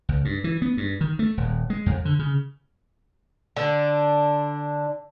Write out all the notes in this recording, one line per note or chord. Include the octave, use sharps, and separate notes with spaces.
C#2
G2
E3
B3
G2
D#3
A3
D#1
G#3
F2
D3
C#3
D3 D4